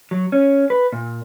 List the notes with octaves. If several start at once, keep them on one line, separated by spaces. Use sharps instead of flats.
F#3
C#4
B4
A#2